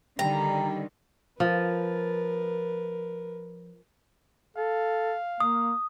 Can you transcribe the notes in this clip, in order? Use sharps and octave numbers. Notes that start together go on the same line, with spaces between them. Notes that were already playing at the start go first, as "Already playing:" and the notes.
D3 D#3 G3 G5 A#5
F3 A#4 B4
A4 F5
A#3 D#6